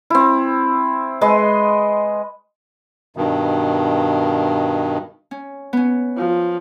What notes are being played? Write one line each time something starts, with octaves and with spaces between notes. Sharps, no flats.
C4 E4
G#3 B4 D#5 C6
G2 B2 D#3
C#4
B3 C#4
F3